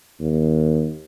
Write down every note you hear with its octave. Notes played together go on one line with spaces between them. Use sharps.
D#2